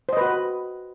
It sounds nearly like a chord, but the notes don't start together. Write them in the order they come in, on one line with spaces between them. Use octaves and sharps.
C5 D#5 B4 F#4